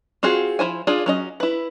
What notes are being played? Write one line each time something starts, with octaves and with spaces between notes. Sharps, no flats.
C4 F4 F#4 G#4
F3 E4 C5 G#5
D4 F4 G#4 D5
F#3 C#4 D#5
E4 B4